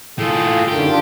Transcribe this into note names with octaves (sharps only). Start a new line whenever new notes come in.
A2 F4 G#4 A4
F#2 D3 D#3 G4
D4 F4